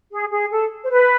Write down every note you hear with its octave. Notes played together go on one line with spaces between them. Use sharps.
G#4
G#4
A4
C5
B4